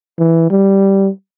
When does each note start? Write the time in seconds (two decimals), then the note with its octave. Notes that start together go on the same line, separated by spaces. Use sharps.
0.18 E3
0.50 G3